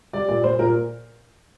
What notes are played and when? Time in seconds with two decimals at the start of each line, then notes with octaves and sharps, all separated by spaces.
0.13 G3 D5
0.29 A#2 D5
0.44 A#2 C5
0.59 A#2 A#4